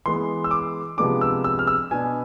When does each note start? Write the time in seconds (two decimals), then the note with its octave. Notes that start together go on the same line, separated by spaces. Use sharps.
0.06 E3 G#3 B3 C6
0.44 E6
0.51 D6
0.97 C3 F3 G#3 B3 D4 D6
1.21 E6
1.44 E6
1.59 F6
1.67 E6
1.91 B2 B3 D4 G#5